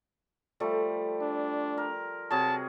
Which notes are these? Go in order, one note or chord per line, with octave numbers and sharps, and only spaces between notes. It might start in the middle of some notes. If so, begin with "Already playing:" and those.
F3 G3 A3
D4
A#4
C3 F#3 G#4 A5